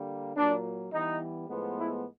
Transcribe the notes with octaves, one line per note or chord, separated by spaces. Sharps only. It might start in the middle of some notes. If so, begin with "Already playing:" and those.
Already playing: D3 G3 A#3
A#2 F#3 A#3 D4
E3 G3 B3 D#4
A2 F3 G#3 B3
E4